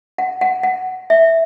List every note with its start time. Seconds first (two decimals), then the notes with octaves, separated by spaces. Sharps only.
0.18 F#5
0.41 F#5
0.63 F#5
1.10 E5